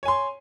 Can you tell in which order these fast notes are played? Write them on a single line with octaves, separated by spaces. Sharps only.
C#5 G#5 C6